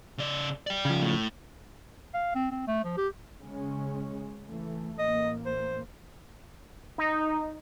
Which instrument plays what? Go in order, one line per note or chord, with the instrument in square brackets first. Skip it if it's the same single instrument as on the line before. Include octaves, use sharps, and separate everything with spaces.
[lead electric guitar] C#3 D5
D5 G5
[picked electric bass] C#3 F3
[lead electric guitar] A2
[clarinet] F5
C4
C4
A3
F3
G4
[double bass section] C#3 G#3 C#4
E3 A3
[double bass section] A1 A#3 [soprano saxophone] D#5
[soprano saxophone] C5
[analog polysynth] D#4